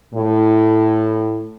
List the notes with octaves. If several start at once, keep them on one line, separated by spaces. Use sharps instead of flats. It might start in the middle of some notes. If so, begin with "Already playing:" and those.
A2